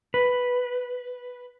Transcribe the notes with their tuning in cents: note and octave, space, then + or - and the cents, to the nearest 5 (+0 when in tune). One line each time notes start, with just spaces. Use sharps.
B4 +0